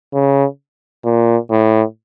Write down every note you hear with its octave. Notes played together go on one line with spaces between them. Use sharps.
C#3
A#2
A2